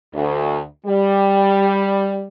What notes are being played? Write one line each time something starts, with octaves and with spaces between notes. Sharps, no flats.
D2
G3